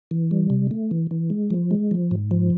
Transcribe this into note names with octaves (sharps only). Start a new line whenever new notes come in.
E3
G3
C3
A3
E3
E3
G#3
F3
G#3
F3
G#2
F3